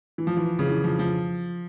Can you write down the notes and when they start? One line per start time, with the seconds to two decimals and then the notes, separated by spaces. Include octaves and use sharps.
0.18 E3
0.27 F3
0.37 E3
0.59 C#3
0.69 E3
0.84 F3
0.99 F3